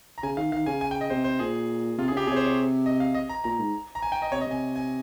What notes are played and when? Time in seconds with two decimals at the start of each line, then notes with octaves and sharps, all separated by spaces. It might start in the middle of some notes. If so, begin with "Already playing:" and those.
0.18 A#5
0.23 C#3 G#5
0.37 D#3 F5
0.52 D#3 F5
0.66 C#3 G#5
0.81 G#5
0.91 G5
1.01 D#5
1.10 C3 C5
1.24 C5
1.39 A#2 G#4
1.98 C3 F4
2.08 G#4
2.12 C#3 G4
2.27 C3 G#4 C#5
2.36 C5
2.46 C#5
2.86 D#5
3.00 F5
3.14 D#5
3.29 A#5
3.44 A#2 A#5
3.59 G#2
3.95 A#5
4.02 G#5
4.12 G5
4.22 D#5
4.31 C3 C#5
4.41 D#5
4.46 C3 G#5
4.76 G#5